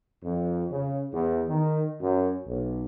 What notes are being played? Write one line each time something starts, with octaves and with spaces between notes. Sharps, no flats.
F2
C#3
E2
D#3
F#2
B1